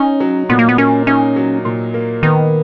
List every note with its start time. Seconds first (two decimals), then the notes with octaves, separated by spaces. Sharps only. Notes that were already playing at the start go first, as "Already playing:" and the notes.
Already playing: C#4 D#4
0.20 F#3
0.49 A#2 B3
0.59 A#3
0.69 B3
0.78 A#3 C#4
1.07 C#4 D#4
1.36 F#3
1.65 A#2
1.94 A#3
2.23 D#3 B3